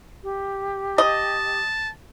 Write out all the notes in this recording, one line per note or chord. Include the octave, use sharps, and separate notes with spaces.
G4
D#5 A5